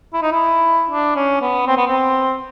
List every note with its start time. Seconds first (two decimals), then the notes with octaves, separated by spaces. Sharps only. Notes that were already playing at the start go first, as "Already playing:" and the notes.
0.13 E4
0.22 D#4
0.32 E4
0.91 D4
1.16 C#4
1.41 B3
1.67 C4
1.77 B3
1.87 C4